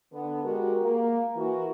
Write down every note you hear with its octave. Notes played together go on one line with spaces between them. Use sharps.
D3 B3
G#3 F#4 G4 A#4
A#3
E3 F#4 A#4